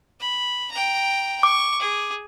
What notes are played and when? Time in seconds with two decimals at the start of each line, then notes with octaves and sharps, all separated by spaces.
0.20 B5
0.71 G5 A#5
1.43 C#6 D6
1.80 G#4